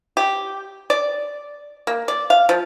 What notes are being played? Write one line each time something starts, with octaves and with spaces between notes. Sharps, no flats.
G4
D5
A#3
D5
F5
F3